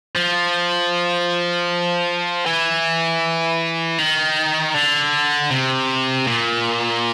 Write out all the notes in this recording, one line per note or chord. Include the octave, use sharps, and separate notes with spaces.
F3
E3
D#3
D3
C3
A#2